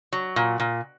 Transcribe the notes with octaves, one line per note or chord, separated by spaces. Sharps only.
F#3
A#2
A#2